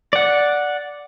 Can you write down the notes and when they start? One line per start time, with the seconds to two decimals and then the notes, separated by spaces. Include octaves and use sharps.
0.13 D5 F#5